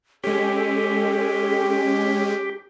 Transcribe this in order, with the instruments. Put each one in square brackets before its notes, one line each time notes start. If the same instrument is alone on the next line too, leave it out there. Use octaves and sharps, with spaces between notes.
[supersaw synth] G#3 C#4 [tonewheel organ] G4 [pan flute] A4